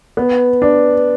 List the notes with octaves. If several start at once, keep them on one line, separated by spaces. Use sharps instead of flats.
B3
D4